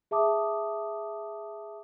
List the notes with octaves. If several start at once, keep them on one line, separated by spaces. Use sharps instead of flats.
G#4 E5 A5 D6 D#6